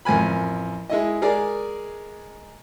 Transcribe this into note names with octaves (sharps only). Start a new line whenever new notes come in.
A1 F2 A#4 G#5 B5
G#3 E4 D#5
G#3 G#4 A#4 D5